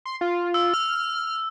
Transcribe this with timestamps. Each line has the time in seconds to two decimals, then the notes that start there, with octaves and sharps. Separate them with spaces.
0.06 C6
0.21 F4
0.54 E6
0.74 F6